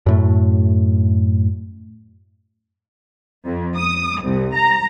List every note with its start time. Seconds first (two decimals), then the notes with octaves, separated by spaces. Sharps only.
0.06 F#2 A2 A3
3.45 F2
3.76 D#6
4.22 C2
4.55 A#5